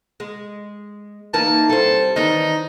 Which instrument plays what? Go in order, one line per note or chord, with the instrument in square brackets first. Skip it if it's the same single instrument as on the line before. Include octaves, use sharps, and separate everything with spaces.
[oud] G#3
[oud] E3 A#3 D#4 [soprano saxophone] A5
[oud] G3 C4 [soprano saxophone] A4
[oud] D#3 E3 D4 [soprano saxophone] D#4